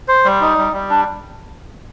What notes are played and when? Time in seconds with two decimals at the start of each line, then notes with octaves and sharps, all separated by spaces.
0.08 C5
0.25 G3
0.41 D#4
0.57 G3
0.73 G3
0.90 D4